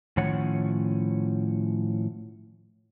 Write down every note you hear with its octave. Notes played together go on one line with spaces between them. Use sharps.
A2 D#3 F3 C#4 C#5 F#5